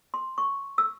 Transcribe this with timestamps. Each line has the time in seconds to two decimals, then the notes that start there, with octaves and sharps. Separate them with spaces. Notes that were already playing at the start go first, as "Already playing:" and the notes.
0.14 C6
0.38 C#6
0.78 E6